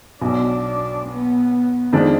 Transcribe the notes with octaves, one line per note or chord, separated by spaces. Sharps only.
B1 B2 F#3 D4
B3
F2 D#3 G#3 D4